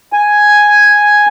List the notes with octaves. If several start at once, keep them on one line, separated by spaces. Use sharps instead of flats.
G#5